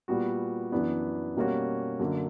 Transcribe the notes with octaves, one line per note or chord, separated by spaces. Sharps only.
A#2 G3 B3 F#4
F#2 E3 B3 D4
B2 G3 A#3 C#4 F#4
F#2 D3 A#3